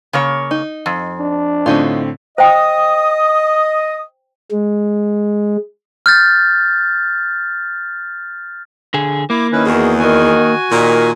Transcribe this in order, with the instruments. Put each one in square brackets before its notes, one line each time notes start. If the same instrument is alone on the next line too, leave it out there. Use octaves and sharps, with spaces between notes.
[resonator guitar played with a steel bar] C#3 A#3 C#5
[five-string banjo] D#4
[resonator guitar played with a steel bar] F2
[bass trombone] D4
[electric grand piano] A2 D3 C4 [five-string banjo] C#4 D#4 F4
[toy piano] C5 G5 [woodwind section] D#5 D#6
[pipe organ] G#3
[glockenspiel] F6 G6 A6
[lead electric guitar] D3 G#4
[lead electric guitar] A#3 [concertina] E4 D6
[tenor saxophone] D#3 [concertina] C#4 E4 B4
[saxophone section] E2 [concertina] F#4 G#4
[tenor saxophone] D#3 [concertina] F#4 G#5
[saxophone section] A#2 [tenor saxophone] D#3